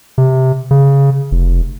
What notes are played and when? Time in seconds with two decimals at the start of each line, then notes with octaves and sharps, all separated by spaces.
0.18 C3
0.71 C#3
1.31 F1